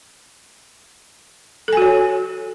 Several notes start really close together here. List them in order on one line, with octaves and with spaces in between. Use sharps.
A4 G#5 F#4 C#5